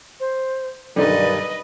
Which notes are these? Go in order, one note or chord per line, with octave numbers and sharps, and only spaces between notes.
C5
B1 G2 D3 D#3 D#4 B4 D5 D#5